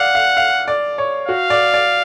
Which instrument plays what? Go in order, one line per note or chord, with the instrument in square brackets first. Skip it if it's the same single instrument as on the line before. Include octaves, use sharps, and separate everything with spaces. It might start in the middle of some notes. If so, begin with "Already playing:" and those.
Already playing: [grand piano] D5 F5 [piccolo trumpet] F#5
[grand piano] F5
F5
D5
C#5
[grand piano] F#4 [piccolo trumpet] F5
[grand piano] D5
D5